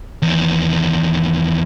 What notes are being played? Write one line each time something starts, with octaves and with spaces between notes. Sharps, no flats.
E2 D#3